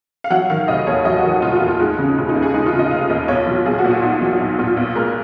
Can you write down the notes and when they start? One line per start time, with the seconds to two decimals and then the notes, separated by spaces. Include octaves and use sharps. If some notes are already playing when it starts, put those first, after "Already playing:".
0.24 F5
0.30 F#3 F#5
0.50 D#3 F5
0.68 F1 D#5
0.87 D#2 C#5
1.05 F#3 D#5
1.18 F#4
1.24 D#3
1.30 F#4
1.42 F1 F4
1.55 F#4
1.61 D#2
1.68 F4
1.80 G#3 D#4
1.98 C#3
2.17 F1 F4
2.29 D#4
2.35 D#2
2.42 G#4
2.54 G#3 D#4
2.66 F4
2.72 C#3
2.79 D#5
2.91 F1 F5
3.10 D#2 D#5
3.28 B1 C#5
3.47 F#3 F4
3.65 B1 G#4
3.78 F#4
3.84 A#2
3.90 F4
4.02 B1 D#4
4.21 F#3 F4
4.40 B1 D#4
4.59 A#2 F4
4.77 B1
4.95 G#3 A#4